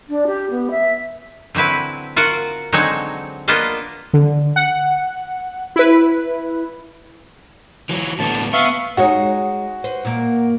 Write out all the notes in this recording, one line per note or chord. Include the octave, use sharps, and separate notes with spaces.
D4
G4
B3
E5
D3 F#3 C4 E4 B4
F4 F#4 A#4 F5 F#5
D3 F#3 G#3 C4 D#4 C#5
A#3 B3 D4 F4 D#5 F5
D3
F#5
E4 B4
E3 F#3
A2 D3 B3 A5
B3 E5 F5 C#6
G#3 D#4 F#4 C#5
B4 C5
A#2 A#3